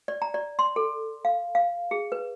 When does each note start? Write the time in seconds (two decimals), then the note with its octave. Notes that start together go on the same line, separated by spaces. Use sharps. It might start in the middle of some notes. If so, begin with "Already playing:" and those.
0.08 D5
0.22 A#5
0.34 D5
0.59 C6
0.76 A4
1.25 F5
1.55 F5
1.91 G#4
2.12 B4